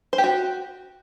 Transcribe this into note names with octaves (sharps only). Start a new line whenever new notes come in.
C5
G4
F#4